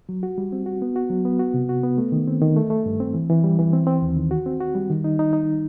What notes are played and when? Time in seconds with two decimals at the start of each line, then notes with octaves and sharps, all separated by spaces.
0.09 F#3
0.23 F#4
0.38 G3
0.52 C4
0.66 F#4
0.82 B3
0.96 F#4
1.10 F#3
1.25 B3
1.39 F#4
1.54 C3
1.69 F#4
1.84 B3
1.98 A3
2.12 D#3
2.27 C4
2.41 D#3
2.56 A3
2.70 A3
2.86 G2
3.00 C4
3.14 E3
3.29 E3
3.44 G3
3.59 E3
3.73 C4
3.87 C4
4.02 D#2
4.17 D#3
4.31 F#4
4.46 C4
4.60 F#4
4.75 G3
4.90 D#3
5.04 D#4
5.19 D#4
5.33 D#4